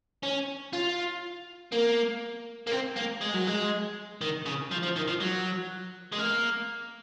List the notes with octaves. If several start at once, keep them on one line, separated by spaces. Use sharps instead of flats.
C#4
F4
A#3
A#3
C4
A#3
G#3
F#3
G#3
D#3
C#3
F3
F3
D#3
F3
F#3
G#3
A#3